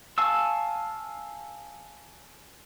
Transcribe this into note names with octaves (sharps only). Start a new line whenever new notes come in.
F5 G#5 A5 C#6 E6